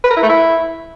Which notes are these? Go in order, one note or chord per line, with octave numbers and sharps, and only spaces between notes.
B4
A#4
E4
A3
E4